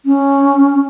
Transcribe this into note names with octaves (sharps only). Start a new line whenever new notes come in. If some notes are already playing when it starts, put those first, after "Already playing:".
C#4